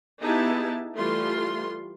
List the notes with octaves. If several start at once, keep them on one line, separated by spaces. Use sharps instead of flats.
B3 D#4 E4 G4 G#4 A5
E3 G3 A3 F4 C6